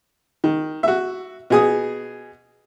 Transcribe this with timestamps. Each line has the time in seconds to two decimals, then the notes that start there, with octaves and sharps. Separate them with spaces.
0.44 D#3
0.83 F#4 E5
1.50 B2 G#4 D#6